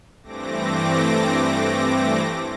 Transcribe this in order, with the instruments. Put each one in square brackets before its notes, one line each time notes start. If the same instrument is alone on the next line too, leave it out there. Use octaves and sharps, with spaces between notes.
[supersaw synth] G2 E3 A3 C4 D6 A#6